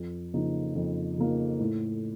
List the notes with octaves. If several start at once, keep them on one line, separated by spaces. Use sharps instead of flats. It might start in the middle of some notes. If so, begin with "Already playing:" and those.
Already playing: F2
C#3 F3 A#3 D#4
F2
C#3 F3 A#3 D#4
A2